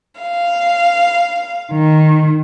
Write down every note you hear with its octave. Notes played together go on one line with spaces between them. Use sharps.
F5
D#3